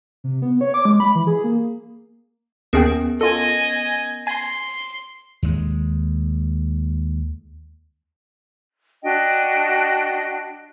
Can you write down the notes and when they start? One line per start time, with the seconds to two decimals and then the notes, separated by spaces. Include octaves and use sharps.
0.24 C3
0.42 B3
0.61 C#5
0.74 D6
0.85 G#3
1.00 B5
1.15 E3
1.27 G#4
1.44 A#3
2.73 D#2 B3 C#4 G#4 A#4 G5
3.21 F4 A4 D#5 G#5
4.27 G#5 C6 G#6 A#6
5.43 D#2 G#3
9.03 D4 F#4 D#5 G5